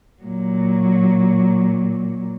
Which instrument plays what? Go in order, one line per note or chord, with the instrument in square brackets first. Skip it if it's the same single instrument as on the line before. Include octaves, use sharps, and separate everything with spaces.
[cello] A#2 F#3